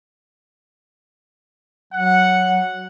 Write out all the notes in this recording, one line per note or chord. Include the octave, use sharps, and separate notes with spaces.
F#3 F#5